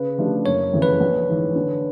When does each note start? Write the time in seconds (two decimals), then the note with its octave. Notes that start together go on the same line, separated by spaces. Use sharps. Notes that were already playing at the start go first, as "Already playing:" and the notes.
Already playing: C#3 B4
0.18 F3 A3 D4 G4
0.46 F#1 C#5
0.73 F2 C#3 E3
0.82 B4
1.00 A#1
1.28 G#2 E3
1.55 D3